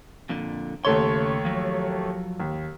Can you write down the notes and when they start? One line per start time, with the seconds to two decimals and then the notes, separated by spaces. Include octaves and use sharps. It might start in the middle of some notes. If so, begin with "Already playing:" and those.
0.29 F2 A#2 D3
0.85 D#2 C#3 A3 C#5 C6
1.45 F3 F#3
2.40 D#2